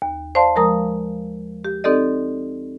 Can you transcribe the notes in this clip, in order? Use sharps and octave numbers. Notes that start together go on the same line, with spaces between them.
D#2
C5 D5 F5 A5 C6
F3 G#3 A#4 A#5 D#6
G4
C4 D#4 G4 A4 D5 D#5